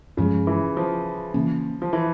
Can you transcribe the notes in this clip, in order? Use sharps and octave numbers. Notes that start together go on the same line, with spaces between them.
G2 C#3 F3 G#3
E3
F3
C#3 E3 A#3 C#4
F3
E3